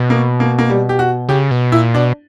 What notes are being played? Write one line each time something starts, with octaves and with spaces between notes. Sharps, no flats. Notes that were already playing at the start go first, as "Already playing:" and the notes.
Already playing: B2
A#3
A#3
A#3
G3
G4
F#4
C#3 G4
B2
A#2 E4
B2 D4